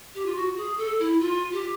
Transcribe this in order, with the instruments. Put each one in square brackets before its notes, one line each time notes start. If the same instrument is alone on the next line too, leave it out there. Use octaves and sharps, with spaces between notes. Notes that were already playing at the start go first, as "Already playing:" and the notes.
[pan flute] G4
F4
F#4
G#4
A4
E4
F4
G4